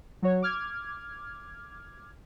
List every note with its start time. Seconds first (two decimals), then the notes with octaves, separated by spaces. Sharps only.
0.22 F#3 F#4 C#5
0.42 D6 F6 G#6